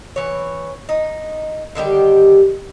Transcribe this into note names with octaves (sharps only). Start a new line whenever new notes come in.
E3 C#5
D#4
D3 D#3 G3 G4